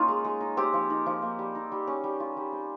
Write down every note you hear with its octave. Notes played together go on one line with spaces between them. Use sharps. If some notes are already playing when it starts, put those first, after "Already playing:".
Already playing: A#3 C#4 D#4 F4
G#3
G#3
D#4
C4 G4
F3
D#4
F3
A#3
G3
D#4
G3
C#4
G3
F4
G3
C4